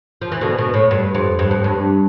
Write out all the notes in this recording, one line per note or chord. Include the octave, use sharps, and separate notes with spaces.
F3
E3
B2 D3
B2
A2
G2
F2
G2
F2
G2